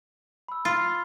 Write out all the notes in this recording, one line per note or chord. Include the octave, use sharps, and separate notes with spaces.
B5 E6
F4 B5 A6